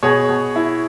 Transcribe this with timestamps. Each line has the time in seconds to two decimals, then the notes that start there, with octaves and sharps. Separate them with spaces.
0.03 B2 G#4 C#5
0.29 B2
0.56 E4